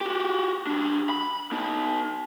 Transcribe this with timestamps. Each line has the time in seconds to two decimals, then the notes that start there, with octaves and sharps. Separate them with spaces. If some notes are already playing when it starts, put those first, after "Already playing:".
0.01 F#4 G4
0.67 F#3 D4
1.10 B5
1.52 B3 D#4